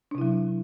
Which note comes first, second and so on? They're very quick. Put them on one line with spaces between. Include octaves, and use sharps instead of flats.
D4 C3 E4 F#3